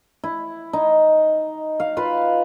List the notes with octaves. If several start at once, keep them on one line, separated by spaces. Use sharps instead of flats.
E4
D#4
F5
F4 B4 F5